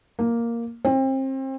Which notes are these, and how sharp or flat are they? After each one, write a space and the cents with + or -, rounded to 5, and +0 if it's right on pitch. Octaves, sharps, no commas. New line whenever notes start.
A#3 +0
C4 +30